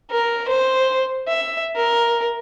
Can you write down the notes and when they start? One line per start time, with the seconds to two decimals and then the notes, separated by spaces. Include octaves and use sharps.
0.11 A#4
0.48 C5
1.28 E5
1.76 A#4